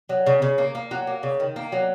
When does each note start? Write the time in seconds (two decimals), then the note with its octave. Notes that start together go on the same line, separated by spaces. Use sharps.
0.09 F#3
0.26 C#3
0.42 C#3
0.58 A#3
0.75 A#3
0.91 F#3
1.07 A#3
1.23 C#3
1.40 D#3
1.56 A#3
1.72 F#3